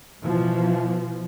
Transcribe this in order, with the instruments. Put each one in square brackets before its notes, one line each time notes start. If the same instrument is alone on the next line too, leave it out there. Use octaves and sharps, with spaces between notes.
[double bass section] B2 E3 F3